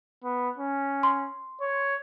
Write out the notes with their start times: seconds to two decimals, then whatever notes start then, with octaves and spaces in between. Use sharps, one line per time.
0.24 B3
0.58 C#4
1.03 C6
1.62 C#5